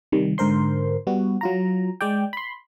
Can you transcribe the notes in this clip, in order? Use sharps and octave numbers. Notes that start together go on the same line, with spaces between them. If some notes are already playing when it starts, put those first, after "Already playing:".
C3 D#3 G3
G#2 D3 A#4 C5 C6
G3 B3 F#4
F#3 F4 A#5
G#3 D5 G5
B5 C6